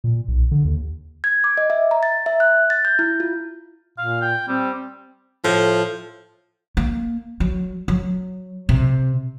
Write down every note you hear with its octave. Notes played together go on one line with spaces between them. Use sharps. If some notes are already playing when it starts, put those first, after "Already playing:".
A#2
B1
D3
D#2
G#6
D6
D#5
E5
A#5
A6
E5
F#6
A6
G6
E4
F4
A#2 F5
G5
G3 C4
A2 F3
A#3
F#3
F#3
C3